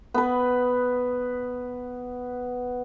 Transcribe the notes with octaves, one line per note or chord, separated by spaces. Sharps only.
B3 B4